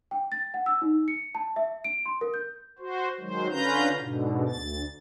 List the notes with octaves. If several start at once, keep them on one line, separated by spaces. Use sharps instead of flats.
G5
A6
F#5
E6
D#4
C#7
A5
E5
D7
C6
A#4
G6
F#4 C5
D#3 F#3 G#3 C5
D3 C#4 F4 B4 A#5 G6
G#2 B2 D3
D2 A6